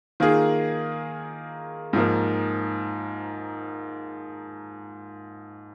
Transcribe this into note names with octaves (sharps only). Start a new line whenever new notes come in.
D#3 A#3 F4 G#4
G#2 F3 A#3